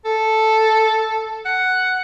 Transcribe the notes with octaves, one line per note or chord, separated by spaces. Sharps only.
A4
F#5